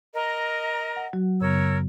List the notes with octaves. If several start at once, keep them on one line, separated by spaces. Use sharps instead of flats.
A#4 D#5 A#5
F#5
F#3 F#4
F#2 C#3 B3 A#4 C#5 E6